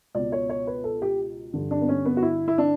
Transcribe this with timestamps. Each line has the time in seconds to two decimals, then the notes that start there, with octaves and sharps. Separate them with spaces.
0.15 C#2 B2 D5
0.32 C#5
0.50 C#5
0.67 B4
0.84 A4
1.02 G4
1.53 G2 D3
1.71 D4
1.81 B3
1.89 C#4
2.05 B3
2.17 F#4
2.22 E4
2.48 E4
2.58 D4